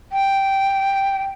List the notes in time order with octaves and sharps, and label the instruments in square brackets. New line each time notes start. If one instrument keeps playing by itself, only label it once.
[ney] G5